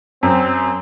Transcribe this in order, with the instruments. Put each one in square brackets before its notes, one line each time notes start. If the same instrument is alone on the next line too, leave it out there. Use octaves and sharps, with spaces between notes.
[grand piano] F#2 [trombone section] C4